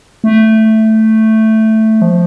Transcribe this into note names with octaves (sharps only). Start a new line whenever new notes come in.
A3
F3